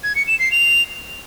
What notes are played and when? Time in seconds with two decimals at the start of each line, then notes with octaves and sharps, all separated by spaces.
0.04 G#6
0.16 C#7
0.28 E7
0.39 C7
0.51 F7